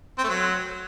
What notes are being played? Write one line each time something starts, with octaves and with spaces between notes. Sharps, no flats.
C4
A3
F#3